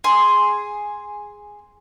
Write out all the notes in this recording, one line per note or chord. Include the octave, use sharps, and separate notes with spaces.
G#4 C6